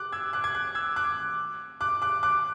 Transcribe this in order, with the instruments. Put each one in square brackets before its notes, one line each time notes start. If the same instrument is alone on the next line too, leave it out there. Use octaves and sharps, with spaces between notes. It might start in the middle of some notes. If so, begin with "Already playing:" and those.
Already playing: [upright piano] D6 F#6
E6 G#6
D6 F#6
G#6
D6 F#6
E6 G#6
D6 F#6
D6 F#6
D6 F#6
D6 F#6